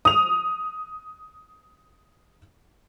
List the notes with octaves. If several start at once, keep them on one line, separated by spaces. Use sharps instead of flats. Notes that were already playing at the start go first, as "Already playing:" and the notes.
D#6 F7